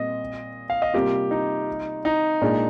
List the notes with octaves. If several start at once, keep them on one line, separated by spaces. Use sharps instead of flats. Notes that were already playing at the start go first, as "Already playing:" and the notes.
Already playing: A#2 G3 C4 D#5
F5
D#5
C3 G3 A#3 F4 G4
D#4
D#4
A#2 G#3 D4